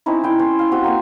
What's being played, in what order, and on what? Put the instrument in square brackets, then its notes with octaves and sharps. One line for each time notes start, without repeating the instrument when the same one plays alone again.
[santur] C4 C#4 D#4 E4
E4 G5
C#4 C5
F5 G5 A#5
C4 F#4 G4
A#3 F#5 G#5